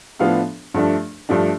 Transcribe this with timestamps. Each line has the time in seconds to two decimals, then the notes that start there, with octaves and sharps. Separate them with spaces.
0.19 A2 F3 B3 D4 F5
0.74 G2 F3 A3 D4
1.29 G2 F3 A3 D4